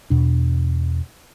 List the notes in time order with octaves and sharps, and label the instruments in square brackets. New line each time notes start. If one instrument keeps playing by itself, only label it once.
[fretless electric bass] E2 B2 D4